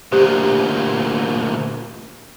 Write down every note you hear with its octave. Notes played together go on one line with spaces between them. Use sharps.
D2 A#2 G4 C5 D#6